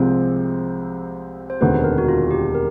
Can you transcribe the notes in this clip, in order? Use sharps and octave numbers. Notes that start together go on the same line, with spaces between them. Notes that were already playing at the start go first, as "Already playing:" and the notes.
Already playing: C2 C3 F3 G#3 C4 C5
C5
E1 D2 C3 D#3 B4
A#4
F#4
F4
G4
A#4